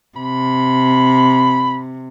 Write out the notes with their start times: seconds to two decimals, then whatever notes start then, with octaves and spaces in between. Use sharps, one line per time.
0.16 C3 B5